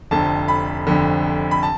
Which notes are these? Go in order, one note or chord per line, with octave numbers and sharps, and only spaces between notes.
F1 F2 D3 A5
B5
F1 F2 D3
B5
A5